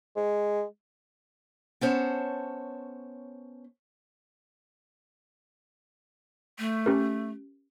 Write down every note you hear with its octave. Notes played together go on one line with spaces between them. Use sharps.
G#3
B3 C#4 C5 C#5 A5
A3
C#4 G4 A#4